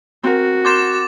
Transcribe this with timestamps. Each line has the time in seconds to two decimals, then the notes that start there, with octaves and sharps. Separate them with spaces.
0.24 C4 F#4 A#4
0.65 A#4 C6 D6 G6 A6 E7